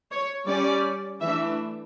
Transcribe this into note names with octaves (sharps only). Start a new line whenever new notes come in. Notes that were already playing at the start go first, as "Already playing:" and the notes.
C#5
G3 C#4 D5
E3 A3 D4 E5